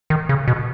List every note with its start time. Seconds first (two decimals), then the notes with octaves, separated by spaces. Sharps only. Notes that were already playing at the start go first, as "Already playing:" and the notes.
0.10 D#3
0.29 C#3
0.48 B2